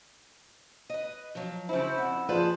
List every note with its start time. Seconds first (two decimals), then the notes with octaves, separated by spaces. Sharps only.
0.90 B4 D#5
1.35 F3 F#3
1.69 C#3 E4 C5
1.98 F2 F#5
2.29 F3 F4 G#4 B4 C5 D5 A5